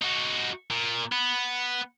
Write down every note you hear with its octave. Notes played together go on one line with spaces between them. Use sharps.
D#4 F#4
A#2
B3